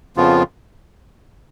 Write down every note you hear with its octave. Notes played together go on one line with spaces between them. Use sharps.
F2 C#3 F3 B3 F4